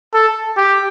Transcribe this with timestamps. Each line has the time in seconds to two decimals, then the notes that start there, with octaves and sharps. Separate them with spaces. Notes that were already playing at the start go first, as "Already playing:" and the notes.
0.14 A4
0.57 G4